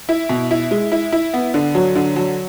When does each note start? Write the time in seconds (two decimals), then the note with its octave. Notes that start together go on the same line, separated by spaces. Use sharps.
0.09 E4
0.29 B2
0.51 E4
0.71 G#3
0.92 E4
1.12 E4
1.34 B3
1.54 D3
1.75 F#3
1.95 D3
2.16 F#3